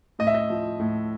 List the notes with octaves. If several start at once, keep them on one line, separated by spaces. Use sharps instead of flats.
A2 D#5
E5
D#5
F3
A2